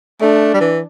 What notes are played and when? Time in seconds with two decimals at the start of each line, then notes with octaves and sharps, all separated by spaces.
0.21 A3 D4
0.54 G3
0.61 E3